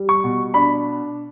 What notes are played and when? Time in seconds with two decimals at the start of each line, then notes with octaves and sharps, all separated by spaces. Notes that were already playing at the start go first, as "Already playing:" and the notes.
Already playing: G3
0.09 C#6
0.24 B2
0.54 D4 B5